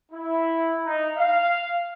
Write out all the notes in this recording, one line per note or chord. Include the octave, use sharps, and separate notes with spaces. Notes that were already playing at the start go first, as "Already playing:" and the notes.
E4
D#4
F5